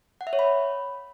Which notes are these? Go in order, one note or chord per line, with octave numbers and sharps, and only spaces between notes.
F#5
E5
C#5
B5